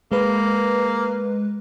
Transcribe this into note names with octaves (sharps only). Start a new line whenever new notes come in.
G#3 A#3 B4